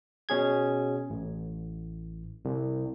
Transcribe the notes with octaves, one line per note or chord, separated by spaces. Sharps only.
B2 C#4 G#4 G#6
A1
C2